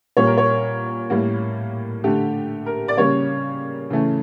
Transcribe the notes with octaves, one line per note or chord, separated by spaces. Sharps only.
A#2 G3 A#3 C#5
A#4
C#5
A2 G3 A#3
D3 A3 G4
A#4
D5
C#3 G3 A#3 C#5
C#3 E3 A3